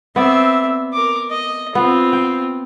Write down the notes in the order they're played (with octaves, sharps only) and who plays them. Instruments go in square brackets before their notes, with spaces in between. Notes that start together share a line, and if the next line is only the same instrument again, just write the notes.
[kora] B3 D5 [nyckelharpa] C4 E5
[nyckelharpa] A#4 D6
D#5
[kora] B3 [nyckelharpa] C4 F4
[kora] G5